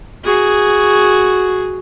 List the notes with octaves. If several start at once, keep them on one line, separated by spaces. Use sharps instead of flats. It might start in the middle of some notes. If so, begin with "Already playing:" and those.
F#4 G#4